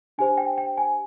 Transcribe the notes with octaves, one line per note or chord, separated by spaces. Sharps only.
D4 G4 C5 G#5
G5
G5
G#5